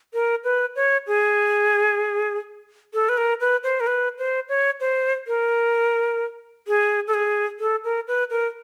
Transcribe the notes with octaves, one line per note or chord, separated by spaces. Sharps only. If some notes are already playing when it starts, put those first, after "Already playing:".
A#4
B4
C#5
G#4
A4
B4
A#4
B4
C5
A#4
B4
C5
C#5
C5
A#4
G#4
A4
G#4
A4
A#4
B4
A#4